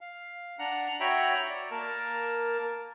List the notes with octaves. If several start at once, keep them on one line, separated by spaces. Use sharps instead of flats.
F5
D4 F#5 A#5
F#4 C#5 E5 G5 A#5 B5
D5
A#3 A#4 A5